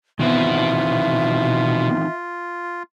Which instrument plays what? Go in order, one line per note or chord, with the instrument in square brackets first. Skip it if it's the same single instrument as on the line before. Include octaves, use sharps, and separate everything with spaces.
[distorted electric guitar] B2 [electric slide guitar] D#3 E3 C4 [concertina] F4 [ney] E5